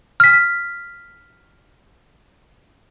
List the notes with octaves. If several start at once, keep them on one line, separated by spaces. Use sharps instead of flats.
F6 B6